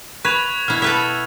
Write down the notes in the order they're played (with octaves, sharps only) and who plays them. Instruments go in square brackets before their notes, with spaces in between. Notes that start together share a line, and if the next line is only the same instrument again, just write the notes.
[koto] B4 [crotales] C#6 G#6 F7
[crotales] F7
[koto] B2 E4 [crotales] F6
[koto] A4 B4 E5